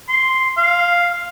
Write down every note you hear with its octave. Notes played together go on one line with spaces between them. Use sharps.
C6
F5